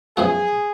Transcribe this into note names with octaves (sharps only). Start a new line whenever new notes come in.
F#2 F3 B3 F#4 G#4